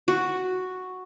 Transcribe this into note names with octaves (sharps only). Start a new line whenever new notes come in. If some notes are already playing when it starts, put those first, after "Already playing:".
F#4